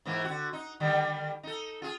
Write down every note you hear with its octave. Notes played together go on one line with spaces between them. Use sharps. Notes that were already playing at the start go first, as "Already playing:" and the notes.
G#2 E3 A#3
D3 F#4
D#4
D3 D#3 G3
D#4 A4
F4 G#4